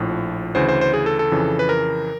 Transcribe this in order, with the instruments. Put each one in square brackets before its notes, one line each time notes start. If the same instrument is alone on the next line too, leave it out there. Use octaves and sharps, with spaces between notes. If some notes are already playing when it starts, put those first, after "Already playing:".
Already playing: [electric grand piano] A#1 A2 F3
D2 C#3 E3 C5
C5
C5
G#4
A4
A4
F2 C#3 E3
B4
A#4